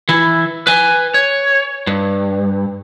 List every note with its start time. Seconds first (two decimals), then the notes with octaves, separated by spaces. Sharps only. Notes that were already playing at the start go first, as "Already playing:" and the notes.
0.09 E3 E4
0.67 B4 G#5
1.14 C#5
1.87 G2